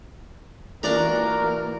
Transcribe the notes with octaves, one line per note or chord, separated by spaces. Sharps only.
E3 A#3 D4 F4 F#4 A#4 D5 A#5